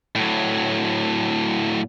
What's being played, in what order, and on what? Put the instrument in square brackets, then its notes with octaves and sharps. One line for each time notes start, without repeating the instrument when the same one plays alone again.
[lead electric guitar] A2 F#3